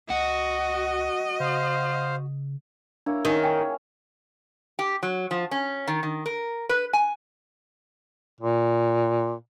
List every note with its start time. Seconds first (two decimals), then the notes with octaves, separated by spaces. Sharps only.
0.10 C#2 F#4 D#5
1.40 C#3 C5 F5
3.06 A#3 D4 E4 C#5
3.25 D#3 C#4 G#4
3.44 C#5 G5 G#5
4.79 G4
5.03 F#3
5.31 F3
5.51 C#4
5.88 D#3
6.03 D#3
6.26 A#4
6.69 B4
6.93 G#5
8.41 A#2